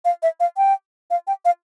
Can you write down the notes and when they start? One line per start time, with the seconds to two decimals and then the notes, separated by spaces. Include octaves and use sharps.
0.05 F5
0.23 E5
0.40 F5
0.57 G5
1.10 F5
1.27 G5
1.45 F5